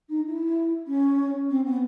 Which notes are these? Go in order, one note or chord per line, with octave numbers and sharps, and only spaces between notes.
D#4
E4
C#4
C4
B3